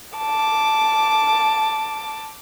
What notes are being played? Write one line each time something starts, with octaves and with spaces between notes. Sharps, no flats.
A5 D6